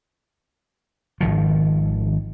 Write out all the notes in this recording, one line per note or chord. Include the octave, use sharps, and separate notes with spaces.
G#1 D#3 F3